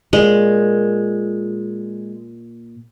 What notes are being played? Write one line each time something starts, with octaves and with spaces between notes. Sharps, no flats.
A#2 G#3